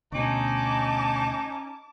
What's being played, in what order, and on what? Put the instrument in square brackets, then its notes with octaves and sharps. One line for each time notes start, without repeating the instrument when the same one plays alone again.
[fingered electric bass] D2 B2 [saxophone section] C#4 D#4 [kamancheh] A5 D6